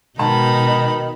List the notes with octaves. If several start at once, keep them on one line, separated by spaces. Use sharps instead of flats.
G#2 B2 D#3 D#4 A5 B5